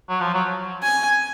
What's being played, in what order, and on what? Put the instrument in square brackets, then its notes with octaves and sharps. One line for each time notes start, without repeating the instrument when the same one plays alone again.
[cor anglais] F#3
F3
F#3
[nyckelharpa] G#5